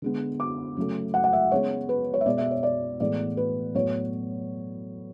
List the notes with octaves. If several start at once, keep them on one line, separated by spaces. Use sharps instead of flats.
D3 G#3 B3
D6
C#3 F#3 A3
F#5
F#5
E5
C#3 G#3 B3 C#5
B4
C#5
E5
B2 G#3 B3 D5
E5
C#5
D5
A2 E3 G#3 B3 D5
B4
A2 F#3 B3 C#5